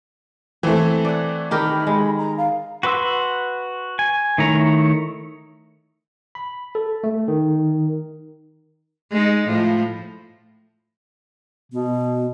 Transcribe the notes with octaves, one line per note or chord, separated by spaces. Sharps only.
E3 A3 C4
D5 F#5
D#3 G4 A#4 B5
G#3
A#5
F5
F#4 B4 C6 E6
G#5
D#3 A3 E4 C#5 A#5
B5
A4
A3
D#3
G#3 D#4
A2 F3
B2 B3